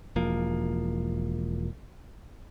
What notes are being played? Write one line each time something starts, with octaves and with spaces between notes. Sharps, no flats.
E1 F3 A#3